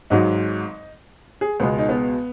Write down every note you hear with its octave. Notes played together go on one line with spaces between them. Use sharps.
G#1 G#2 F#3 D#4
G#4
C#2 B2 G#3 B3
D#4
B3